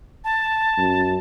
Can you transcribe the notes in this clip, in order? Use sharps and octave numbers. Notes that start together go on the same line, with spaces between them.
A5
F#2